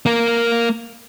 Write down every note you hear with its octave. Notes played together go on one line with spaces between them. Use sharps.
A#3 A#4